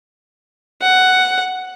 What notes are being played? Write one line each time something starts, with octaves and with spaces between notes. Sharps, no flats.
F#5